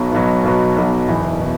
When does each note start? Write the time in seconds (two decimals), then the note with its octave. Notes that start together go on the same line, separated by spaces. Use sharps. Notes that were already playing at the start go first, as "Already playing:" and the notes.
Already playing: B1 B2 F#3
0.12 B1 B2 F#3
0.44 B1 B2 F#3
0.76 B1 B2 F#3
1.08 F#1 E2 B2
1.40 B2